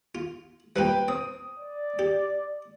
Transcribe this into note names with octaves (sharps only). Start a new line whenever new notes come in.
F4
G3 A#3 F4 B4 G5
C4 D#6
D5
G4